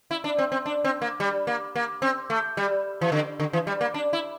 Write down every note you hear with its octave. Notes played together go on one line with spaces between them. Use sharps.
E4
D4
C4
C4
D4
C4
A#3
G3
A#3
A#3
C4
A3
G3
E3
D3
D3
E3
G3
A#3
D4
E4